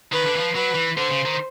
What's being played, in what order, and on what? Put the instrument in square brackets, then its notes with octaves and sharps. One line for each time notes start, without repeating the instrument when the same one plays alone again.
[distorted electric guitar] D#3 [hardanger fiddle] B4
[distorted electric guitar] D3
E3
F3
[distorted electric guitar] F#3 [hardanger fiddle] B4
[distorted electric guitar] E3
[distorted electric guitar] D3 [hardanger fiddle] C5
[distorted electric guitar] C#3
D#3